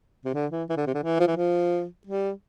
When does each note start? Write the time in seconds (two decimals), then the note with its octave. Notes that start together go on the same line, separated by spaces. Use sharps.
0.25 C3
0.34 D3
0.52 E3
0.69 E3
0.77 D3
0.87 C3
0.94 D3
1.03 E3
1.20 F3
1.28 E3
1.36 F3
2.07 G3